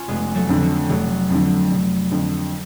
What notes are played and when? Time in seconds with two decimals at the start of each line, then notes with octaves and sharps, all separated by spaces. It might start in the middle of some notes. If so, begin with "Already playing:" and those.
Already playing: C#4 F4
0.08 F1 G#3 B3
0.35 F#3 A3
0.49 F2 D3
0.62 F#3
0.90 F1 F#3
1.30 F2 D3
1.71 F1
2.11 F2 D3